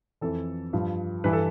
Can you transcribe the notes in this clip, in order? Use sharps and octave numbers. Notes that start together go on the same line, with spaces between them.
F2 E3 A4
G2 F3
G2 E3 B4
A4